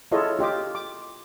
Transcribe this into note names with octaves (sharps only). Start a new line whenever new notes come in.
E4 F4 G#4 A4 C#5 D#5
F4 G4 D#5 D6
D6